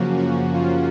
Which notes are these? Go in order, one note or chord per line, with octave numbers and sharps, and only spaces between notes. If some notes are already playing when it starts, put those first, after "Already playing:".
Already playing: F#2 C#3 F3 A#3 C#4 F#4
F#4
F4